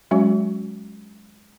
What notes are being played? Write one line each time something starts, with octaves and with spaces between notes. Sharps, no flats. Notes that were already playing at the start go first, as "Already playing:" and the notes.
F#3 G#3 C#4 F#4